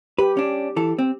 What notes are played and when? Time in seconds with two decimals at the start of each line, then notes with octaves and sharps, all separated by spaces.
0.19 G4 B4
0.37 C#4 D4
0.76 E3 A4
0.98 C4